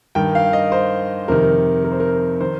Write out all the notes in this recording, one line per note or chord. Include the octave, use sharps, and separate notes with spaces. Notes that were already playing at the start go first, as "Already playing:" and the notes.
G2 D#3 G5
F5
D#5
C5
F2 C3 D#3 A#4
A#4
C5
A#4
D#3 C5